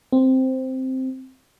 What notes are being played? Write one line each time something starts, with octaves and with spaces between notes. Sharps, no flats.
C4